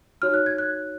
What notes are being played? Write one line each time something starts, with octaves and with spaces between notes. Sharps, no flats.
D#4 F#4 C#5 F6
F#6
G#6
F#6